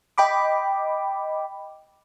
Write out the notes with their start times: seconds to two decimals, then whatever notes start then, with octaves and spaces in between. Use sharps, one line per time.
0.18 D#5 G5 B5 D6